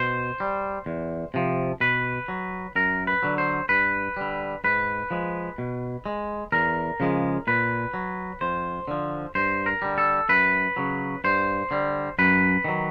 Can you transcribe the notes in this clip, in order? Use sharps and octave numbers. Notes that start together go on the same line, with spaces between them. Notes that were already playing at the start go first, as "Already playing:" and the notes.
Already playing: B2 C5
G3
E2
C3 F3
B2 B4
F#3
F#2 A#4
B4
D3 F#3
C5
G2 B4
D3 G3
G#2 B4
F3 G#3
B2
G#3
E2 A#4
C#3 F3 G#3
A#2 B4
F#3
F2 C5
D3 F3
G2 C5
A#4
D3 G3
A4
F#2 B4
C#3 F#3
G2 C5
D3 G3
F#2 B4
D#3 F#3